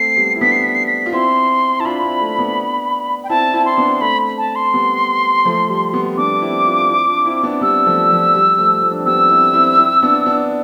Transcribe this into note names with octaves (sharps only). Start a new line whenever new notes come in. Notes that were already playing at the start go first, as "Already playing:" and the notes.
Already playing: A3 C4 C7
G3 B3
E4
B3 D4 B6
C7
B6
C7
B6
F4
C4 E4 C6
E4 A5
D4 F4 B5
C4 E4
A3 C4
B3 D4
G5
C4 E4 A5
C4 E4
C6
B3 D4
A3 C4 B5
A5
C6
G3 B3
F3 A3
G3
G3 B3
B3 D4 D6
C4 E4
D4 F4
C4 E4
D4 F4
C4 E4
B3 D4
G3 B3 E6
F3 A3
F3
G3
F3 A3
F3 A3
D4
C4
G3 B3 E6
C4 E4
C4 E4
C4 E4
B3 D4
B3 D4